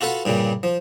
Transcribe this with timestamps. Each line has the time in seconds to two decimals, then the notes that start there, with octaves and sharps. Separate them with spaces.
0.01 F4 F#4 A4 B4 F#5
0.25 G2 A#2 C#3 G3
0.63 F3